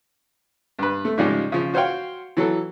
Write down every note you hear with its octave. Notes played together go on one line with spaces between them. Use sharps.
G2 B4
A3
G#2 C#3 F3 G3 G#3
C#3 F3
F#4 C5 C#5 F5 G5
E3 F#3 A4